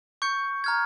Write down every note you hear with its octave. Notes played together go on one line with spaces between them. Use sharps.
C#6 G6 C#7
A#5 F6 G#6